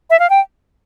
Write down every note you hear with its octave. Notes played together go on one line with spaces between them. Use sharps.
E5
F5
G5